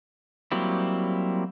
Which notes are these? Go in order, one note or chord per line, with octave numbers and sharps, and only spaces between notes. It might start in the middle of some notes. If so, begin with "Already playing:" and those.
F#3 G3 A#3 C4 E4